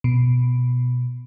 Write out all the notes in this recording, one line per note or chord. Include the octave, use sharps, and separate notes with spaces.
B2